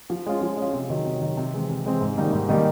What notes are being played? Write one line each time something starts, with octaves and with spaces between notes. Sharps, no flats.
F3
G#3 C#4 F4
F3
G#3 C#4 F4
C3
D#3 F#3
C3
D#3 F#3
C3
E3 G#3 C4
C3
E3 G#3 C4
G#2
D#3 G3 A#3 D#4
G#2
D#3 G3 A#3 D#4